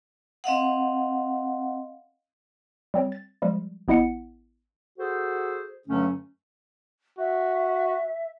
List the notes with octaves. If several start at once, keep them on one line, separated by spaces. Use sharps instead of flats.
C4 D#5 F5 F#5
G3 C4 C#5
A6
F3 G3 G#3
A1 B3 E4 D#5 F#5 C#7
F#4 G#4 A4 C5
G2 D3 F#3 A3 C#4
F#4 E5